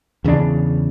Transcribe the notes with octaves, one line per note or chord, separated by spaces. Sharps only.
E2 C#3 A#3 D4